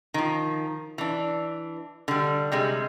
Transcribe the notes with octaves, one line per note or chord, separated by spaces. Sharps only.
D#3 F3
E3 D4
D3 G3
C3 G3 G#3